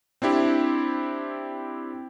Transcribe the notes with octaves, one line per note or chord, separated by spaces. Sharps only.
C4 D4 E4 G4